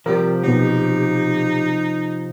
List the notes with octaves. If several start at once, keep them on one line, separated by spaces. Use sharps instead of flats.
C3 F3 G3 G4 A#4
B2 F#3 D#4